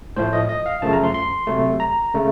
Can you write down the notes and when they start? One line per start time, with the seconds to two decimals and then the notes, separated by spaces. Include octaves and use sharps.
0.16 A2 F3 A3 C5
0.33 D#5
0.49 D#5
0.66 F5
0.82 F#2 C#3 F3 A3 A5
0.93 A#5
1.03 C6
1.14 C6
1.47 C3 F#3 A3
1.80 A#5
2.14 C#3 A3